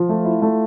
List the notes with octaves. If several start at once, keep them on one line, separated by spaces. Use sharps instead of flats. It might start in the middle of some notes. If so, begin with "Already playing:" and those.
Already playing: F3 F4
A3
E4
A3